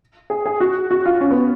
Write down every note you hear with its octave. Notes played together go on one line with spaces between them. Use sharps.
G#4
G#4
F#4
F#4
F4
C#4
B3